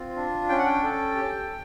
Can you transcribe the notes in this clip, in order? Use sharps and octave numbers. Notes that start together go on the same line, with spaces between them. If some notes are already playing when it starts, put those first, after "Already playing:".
Already playing: C4 F4
D4
C#4 G5
F#5
G5
A4
G4